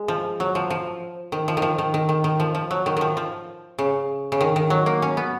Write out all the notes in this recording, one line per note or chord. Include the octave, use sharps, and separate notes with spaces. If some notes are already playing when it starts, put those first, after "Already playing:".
Already playing: G#3
F3
F#3
F3
F3
D#3
F3
D#3
F3
D#3
D#3
D#3
D#3
F3
F3
F#3
D#3
D#3 F3
F3
C#3
C#3
D#3
D#3
F#3
A#3
C#4
B3